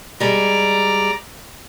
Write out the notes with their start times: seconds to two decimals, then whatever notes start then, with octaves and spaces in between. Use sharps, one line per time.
0.20 G3 G#3 D5 A#5